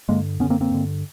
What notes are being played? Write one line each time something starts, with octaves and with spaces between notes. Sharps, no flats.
G2 D3 G#3 A#3
F#2 D3 B3 C#4
A#3 C4
A#3 C4
G2 D3